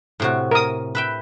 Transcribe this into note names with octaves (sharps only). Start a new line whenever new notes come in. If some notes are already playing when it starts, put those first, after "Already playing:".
A2 C3 F#4
A#4 D#6
B4 E5 G5